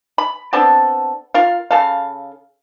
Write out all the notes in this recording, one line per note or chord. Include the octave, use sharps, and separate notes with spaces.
B5
B3 C4 D4 A4
F4 A#4 F5
C#3 A4 F5